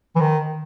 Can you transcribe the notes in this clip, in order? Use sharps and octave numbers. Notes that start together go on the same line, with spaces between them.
E3
D#3